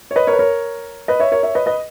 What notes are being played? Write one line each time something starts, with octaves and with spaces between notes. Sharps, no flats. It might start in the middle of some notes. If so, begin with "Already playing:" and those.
C#5
B4 D#5
A#4 C#5
B4
A#4 C#5
B4 D#5
C#5 E5
A#4 C#5
C#5 E5
B4 D#5
B4 D#5